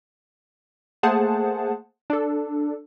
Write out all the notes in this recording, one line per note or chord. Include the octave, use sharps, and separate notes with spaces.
A3 A#3 G#4 C5 F#5 A5
D4 A4